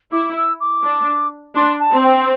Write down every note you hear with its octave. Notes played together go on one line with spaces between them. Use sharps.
E4 D6
E6
D6
D4
D4 C6
A5
C4
G5